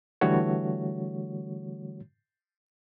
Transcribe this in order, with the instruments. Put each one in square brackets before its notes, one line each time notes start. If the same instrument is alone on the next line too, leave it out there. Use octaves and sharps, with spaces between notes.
[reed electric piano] D3 E3 G3 A3 F#4 C#5